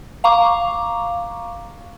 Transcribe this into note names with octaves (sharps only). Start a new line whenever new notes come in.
F5 A#5 C#6 D6